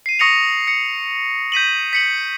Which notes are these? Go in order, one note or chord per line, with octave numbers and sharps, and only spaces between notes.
C7 D#7
C#6 D#6 A#6 C#7 F7
C#7
G6 B6 D#7 F#7
B6 C#7 F#7